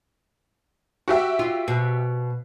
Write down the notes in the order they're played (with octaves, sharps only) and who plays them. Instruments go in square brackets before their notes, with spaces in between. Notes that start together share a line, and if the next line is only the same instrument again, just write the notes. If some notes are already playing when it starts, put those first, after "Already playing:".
[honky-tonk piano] F#4 G4 E5
[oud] F4
B2